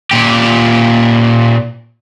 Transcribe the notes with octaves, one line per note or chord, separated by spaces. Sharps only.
A#2 G4